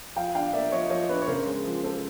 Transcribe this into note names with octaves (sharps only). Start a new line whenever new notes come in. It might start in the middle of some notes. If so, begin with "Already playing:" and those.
F3 F5 G5
D4 F5 G5
A#3 D5 E5
F3 C#5 D#5
F3 C#5 D#5
D4 B4 C#5
C#5
C#3 A#4 C5
G#3
F3
C4 A4